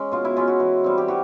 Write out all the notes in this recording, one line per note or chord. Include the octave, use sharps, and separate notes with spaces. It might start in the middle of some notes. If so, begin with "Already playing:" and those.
Already playing: G#3 C#4
B2 F4
E4
G#3 C#4 E4 F4
F#4
E3
G3 C4
G4
E3 F#4